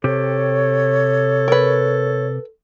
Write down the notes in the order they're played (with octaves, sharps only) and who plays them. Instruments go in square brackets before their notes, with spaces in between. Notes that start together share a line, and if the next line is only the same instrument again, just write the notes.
[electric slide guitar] C3 G4 [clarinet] A4 [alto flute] C#5
[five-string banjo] A#4 B4